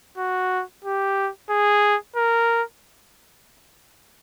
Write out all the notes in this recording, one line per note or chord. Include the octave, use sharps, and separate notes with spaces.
F#4
G4
G#4
A#4